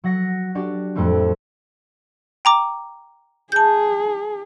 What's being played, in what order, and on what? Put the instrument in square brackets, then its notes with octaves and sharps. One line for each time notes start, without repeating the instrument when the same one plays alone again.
[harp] F#3 F#5 A#6 C#7
D4 F#4 G4 D5
F2 A2 G3 A3 C4
[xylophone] G5 A#5 D6
[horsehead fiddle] G#4 [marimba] A5 G6